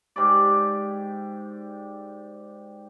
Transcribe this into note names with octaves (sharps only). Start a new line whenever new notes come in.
G#2 G4 D5